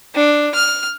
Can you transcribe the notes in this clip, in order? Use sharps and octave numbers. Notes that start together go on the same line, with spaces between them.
D4
F6